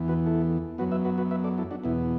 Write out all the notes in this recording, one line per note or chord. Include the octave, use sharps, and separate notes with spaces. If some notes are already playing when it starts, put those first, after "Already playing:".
Already playing: E2 E3 B3
F#4 B4
E4 A4
F#2 F#3 B3 F#4 B4
B4 E5
F#4 B4
F#4 B4
B4 E5
A4 D5
E4 A4
D4 F#4
E2 B2 B3 E4